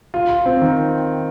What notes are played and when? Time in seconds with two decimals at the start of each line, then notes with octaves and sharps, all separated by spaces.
0.14 F4
0.30 F4
0.46 C4
0.61 D#3